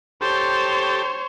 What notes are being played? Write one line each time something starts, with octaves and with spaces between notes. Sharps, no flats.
G4 A4 C5 C#5